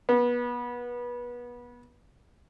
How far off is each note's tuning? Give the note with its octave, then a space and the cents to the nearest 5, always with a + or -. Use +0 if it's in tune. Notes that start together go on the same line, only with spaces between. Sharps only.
B3 -25